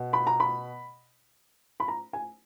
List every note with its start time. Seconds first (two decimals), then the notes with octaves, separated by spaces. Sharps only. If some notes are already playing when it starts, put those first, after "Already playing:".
Already playing: B2
0.13 B5
0.27 A#5
0.40 B5
1.80 B5
1.88 A#5
2.13 G#5